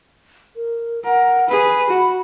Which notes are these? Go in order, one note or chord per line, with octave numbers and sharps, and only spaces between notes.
A#4
A#4 F#5
G#4 B4 B5
F#4